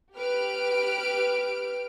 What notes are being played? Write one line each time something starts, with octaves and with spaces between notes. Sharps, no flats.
G4 B4 F6 D7